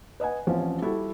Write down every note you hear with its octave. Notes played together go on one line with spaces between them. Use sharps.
B4 D#5 F#5 G#5
A1 F3 C4 C#4
G3 E4 F#4 A4